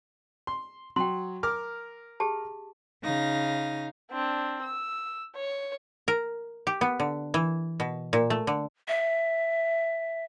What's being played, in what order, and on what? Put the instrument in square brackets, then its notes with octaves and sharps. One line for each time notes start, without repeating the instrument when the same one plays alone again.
[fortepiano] C6
[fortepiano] F#3 [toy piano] G5 C6
[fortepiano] A#4 D6 F6
[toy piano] G4 G#4 A5
[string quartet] C#3 D#4 F5 A#6
[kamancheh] C4 D4
E6
C#5
[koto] A#4
G4
B3
D3
E3
B2
A#2
A3
D3
[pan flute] E5